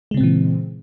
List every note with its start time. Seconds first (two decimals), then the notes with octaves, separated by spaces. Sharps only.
0.11 G#3
0.14 C#3
0.17 C4
0.20 A#2
0.23 E3